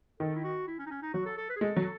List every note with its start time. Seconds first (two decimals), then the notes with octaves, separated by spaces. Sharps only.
0.20 D#3 A4
0.35 E4
0.44 F#4
0.67 E4
0.79 C#4
0.86 D#4
0.91 C#4
1.02 D#4
1.14 F#3 F#4
1.26 A4
1.37 A4
1.50 B4
1.56 G#4
1.61 G#3 A4
1.77 F#3